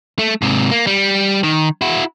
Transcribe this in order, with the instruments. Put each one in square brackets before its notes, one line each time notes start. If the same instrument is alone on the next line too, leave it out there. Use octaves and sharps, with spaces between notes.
[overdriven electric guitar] A3
G#2 C3
A#3
G3
D#3
E4 F#4